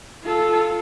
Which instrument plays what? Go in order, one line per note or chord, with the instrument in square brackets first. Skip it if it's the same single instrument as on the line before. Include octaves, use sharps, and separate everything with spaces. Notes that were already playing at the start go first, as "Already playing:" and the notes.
[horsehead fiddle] F4 A4